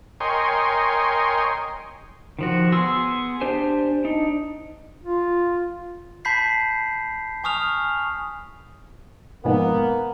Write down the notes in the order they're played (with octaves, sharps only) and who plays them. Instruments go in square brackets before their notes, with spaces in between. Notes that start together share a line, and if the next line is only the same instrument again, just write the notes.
[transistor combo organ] A#4 C#5 D#5 G5 G#5 C6
[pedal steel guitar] D#3 F3 F#4
B3 G#4 C6 E6
D4 G4 C5 G#5
D4 D#4
[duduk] F4
[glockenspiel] A5 B5 G6 B6 C7
G#5 C#6 D#6 F6 F7
[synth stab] B1 F2 G#2 [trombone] A#3 [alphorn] B3